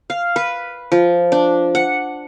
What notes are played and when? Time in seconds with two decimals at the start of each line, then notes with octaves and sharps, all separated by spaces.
0.10 F5
0.36 B4
0.92 F3
1.32 D4
1.75 F#5